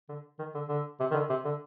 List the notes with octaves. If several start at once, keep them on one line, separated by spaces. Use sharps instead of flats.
D3
D#3
D3
D3
C3
D#3
D3
C3
D3